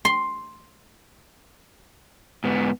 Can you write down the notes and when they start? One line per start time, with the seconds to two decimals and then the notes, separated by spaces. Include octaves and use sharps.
0.05 C6
2.44 G#2 B3